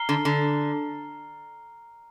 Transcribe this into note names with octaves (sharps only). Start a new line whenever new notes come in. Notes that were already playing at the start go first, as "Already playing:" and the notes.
Already playing: A#5 F6 C7 G7
D3
D3